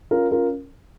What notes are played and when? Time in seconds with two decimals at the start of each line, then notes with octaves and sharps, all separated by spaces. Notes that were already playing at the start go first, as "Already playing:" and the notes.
0.11 C#4 F4 A#4
0.31 C#4 F4 A#4